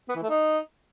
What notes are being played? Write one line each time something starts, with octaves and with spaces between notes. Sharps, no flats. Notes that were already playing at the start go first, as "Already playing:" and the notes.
B3
E3
A3
D#4